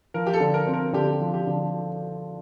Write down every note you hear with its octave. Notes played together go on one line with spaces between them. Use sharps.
F3 A#4
G4
A4
D3
A#4
C4
A#4
D3 G4
F3
G4
D3